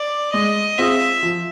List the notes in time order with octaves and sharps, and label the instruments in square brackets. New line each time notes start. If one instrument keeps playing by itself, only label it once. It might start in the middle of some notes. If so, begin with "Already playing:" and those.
Already playing: [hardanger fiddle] D5
[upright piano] G#3 [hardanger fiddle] D#5
[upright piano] C4 F4 G#4 [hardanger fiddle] E5
[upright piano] F3